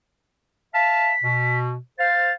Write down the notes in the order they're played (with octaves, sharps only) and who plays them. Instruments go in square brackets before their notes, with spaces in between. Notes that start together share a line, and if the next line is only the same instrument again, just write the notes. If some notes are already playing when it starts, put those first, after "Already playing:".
[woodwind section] E5 F5 A5 [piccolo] B6
[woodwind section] B2
[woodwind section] C5 F5 [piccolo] A6